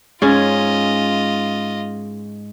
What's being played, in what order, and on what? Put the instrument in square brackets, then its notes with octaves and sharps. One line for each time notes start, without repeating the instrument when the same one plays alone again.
[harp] G#2 C#4 G#4 [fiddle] F4 D#5